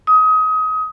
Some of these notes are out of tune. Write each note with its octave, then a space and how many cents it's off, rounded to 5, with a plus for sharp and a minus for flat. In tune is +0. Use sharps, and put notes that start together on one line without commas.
D#6 +25